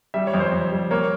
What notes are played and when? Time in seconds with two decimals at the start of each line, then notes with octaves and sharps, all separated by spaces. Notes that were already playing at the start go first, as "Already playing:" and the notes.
0.14 G3 E5
0.27 C#5
0.33 F2
0.40 C5
0.52 F2
0.72 G3
0.91 A#3 C#5